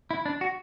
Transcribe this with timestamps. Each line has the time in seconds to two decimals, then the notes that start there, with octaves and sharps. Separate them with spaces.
0.11 E4
0.26 D4
0.41 F#4